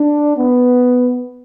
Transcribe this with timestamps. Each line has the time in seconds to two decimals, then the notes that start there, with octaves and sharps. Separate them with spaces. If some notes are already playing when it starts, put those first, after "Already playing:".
Already playing: D4
0.37 B3